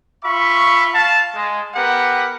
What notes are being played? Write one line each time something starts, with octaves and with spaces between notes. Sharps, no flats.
F4 E5 B5 C#6
F5 A5
G#3
B3 G4 A#4 F#5